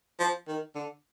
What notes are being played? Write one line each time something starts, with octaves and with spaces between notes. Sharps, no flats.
F3
D#3
D3